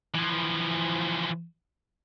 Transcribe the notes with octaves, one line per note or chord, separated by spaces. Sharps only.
E3 F3